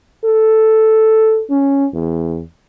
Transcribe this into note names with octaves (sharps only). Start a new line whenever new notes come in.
A4
C#4
E2